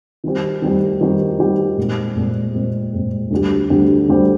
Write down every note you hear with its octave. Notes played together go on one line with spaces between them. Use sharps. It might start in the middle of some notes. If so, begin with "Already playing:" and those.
D#3 G3 C4 G4
D#3 G3 C4 G4
D#3 G3 C4 G4
D#3 G3 C4 G4
A#2 G#3 C4
A#2 G#3 C4
A#2 G#3 C4
A#2 G#3 C4
D2 D3 G3 C4 G4
D2 D3 G3 C4 G4
D2 D3 G3 C4 G4